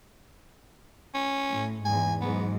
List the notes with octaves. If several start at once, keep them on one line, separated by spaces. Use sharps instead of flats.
C#4
A2
E2 G#2 G#5
G#2 F#3 B3